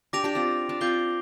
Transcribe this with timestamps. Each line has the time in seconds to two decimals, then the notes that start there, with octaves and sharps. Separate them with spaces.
0.13 D4 G4 D6 A#6 D7 F7
0.24 D4 G4
0.35 C4 F4
0.69 D4
0.81 C4 F4 D6 G6 C7 G7